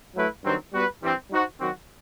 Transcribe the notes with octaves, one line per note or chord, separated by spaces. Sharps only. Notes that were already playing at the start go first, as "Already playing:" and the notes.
F#3 A3 E4 B4
G2 D#3 F#3 C4
G3 B3 F#4 B4
G2 E3 G3 C4
G3 D#4 F#4 C5
D#3 F#3 C4 F#4